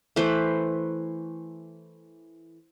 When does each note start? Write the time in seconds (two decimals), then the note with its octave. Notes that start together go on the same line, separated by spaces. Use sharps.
0.16 E3 A3 B4 C5